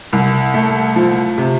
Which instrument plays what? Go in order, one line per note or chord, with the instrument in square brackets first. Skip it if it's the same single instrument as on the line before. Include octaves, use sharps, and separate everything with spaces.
[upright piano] C2
A3
F3
C3